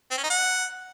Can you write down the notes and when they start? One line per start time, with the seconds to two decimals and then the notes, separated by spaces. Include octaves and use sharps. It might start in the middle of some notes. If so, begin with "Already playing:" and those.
0.11 C4
0.17 C#4
0.24 D#4
0.30 F#5